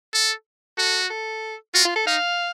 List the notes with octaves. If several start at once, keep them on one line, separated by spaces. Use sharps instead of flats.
A4
F#4 A4
A4
F4 F#4
F4
A4
D#4 F5